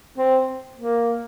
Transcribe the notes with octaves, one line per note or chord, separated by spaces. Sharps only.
C4
A#3